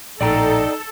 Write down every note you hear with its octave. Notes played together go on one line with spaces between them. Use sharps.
A#1 A2 D#4 A4 D5 G5 A#5